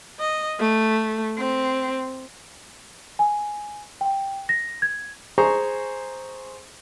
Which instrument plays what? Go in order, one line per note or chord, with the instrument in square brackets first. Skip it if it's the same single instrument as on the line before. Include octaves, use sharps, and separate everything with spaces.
[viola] D#5
A3
C4
[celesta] G#5
G5
A#6
G#6
[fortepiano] G#4 C5 G#5 A#5 C6 C#6